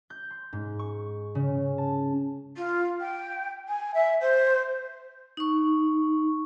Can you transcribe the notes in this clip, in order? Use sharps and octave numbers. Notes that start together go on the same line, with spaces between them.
G6
C6
G#2
C#6
C#3
A5
F4
G5
G#5
E5
C5
D#4 C#6